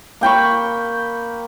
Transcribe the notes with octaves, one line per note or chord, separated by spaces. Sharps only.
A#3 G5 B5 C#6